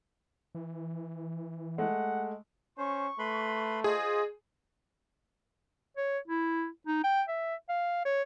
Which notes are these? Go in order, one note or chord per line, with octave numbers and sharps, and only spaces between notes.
E3
G#3 A3 F#5
C#4 C5 C#6
A3 B4 B5 C6
F4 G#4 C5 D#5 D#6
C#5
E4
D#4
G5
E5
F5
C#5